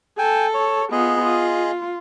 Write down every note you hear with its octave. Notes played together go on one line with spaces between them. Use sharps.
A4 G5 G#5
C#5
B3 F4 G#4 D#5
F4